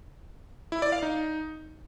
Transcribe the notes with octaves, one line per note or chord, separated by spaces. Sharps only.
E4
D5
F5
D#4